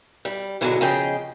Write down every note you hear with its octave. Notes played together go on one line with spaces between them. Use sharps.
G3
G#2 B2 D3 E3 F#3 G#3
C#3 F3 G#4 D#5 G5